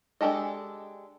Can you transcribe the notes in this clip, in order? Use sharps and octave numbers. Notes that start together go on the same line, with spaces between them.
G#3 D4 G4 A4 D#5